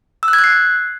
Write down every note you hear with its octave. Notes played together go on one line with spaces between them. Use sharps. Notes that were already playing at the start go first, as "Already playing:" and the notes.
E6
F#6
G#6
F#6
C7